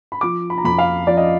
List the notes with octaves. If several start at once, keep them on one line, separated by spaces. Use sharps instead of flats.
B5
F3 D6
B5
A#5
F2 B5
F5
F3 D5
D#5